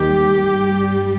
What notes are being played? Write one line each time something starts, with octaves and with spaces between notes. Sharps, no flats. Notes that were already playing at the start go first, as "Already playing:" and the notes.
Already playing: D#2 D#3 G3 G4
G2 G3